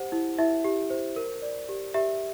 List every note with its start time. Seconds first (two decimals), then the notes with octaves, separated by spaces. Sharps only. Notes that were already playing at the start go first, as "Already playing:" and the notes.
Already playing: G4 C5 F#5
0.12 E4
0.38 E4 E5
0.65 G4
0.90 C5
1.16 A#4
1.42 D5
1.69 G4
1.94 G4 E5